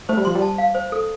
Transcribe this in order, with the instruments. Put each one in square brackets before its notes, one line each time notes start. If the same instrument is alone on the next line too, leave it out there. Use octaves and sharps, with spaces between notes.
[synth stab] A3 [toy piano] C5
[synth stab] G3
[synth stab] F3 [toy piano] C6
[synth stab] G3
[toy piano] A5
F5
C5
A4